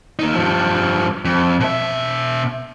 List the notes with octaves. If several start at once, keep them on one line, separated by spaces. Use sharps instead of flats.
A#3 D#4
G2 F3
F2
B2 E5